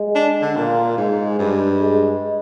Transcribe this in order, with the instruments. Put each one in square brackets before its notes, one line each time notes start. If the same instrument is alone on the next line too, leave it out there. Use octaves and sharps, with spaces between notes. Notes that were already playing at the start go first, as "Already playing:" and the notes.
Already playing: [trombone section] G#3
[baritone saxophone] D4
D3
[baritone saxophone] A#2 [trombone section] A#3
[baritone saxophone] G#2 [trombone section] G#3
[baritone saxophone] G2
[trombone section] G#3